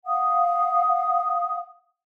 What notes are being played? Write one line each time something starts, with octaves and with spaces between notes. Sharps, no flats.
F5 F#5 D#6